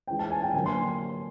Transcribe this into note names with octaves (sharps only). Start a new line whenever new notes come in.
E3 G#3 C#4 G5
A5
G#5
G5
D3 F#3 A#3 D4 G#5
C6